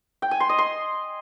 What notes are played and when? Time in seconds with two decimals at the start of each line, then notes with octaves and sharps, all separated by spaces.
0.22 G5
0.31 G#5
0.40 C6
0.49 D#5
0.58 C6